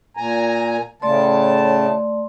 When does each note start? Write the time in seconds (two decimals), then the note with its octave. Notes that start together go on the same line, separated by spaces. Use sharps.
0.17 A#2 G#5 A#5
1.02 A2 C#3 A3 D5 A5 C6